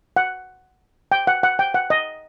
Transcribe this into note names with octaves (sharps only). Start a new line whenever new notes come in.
F#5
G5
F#5
F#5
G5
F#5
D#5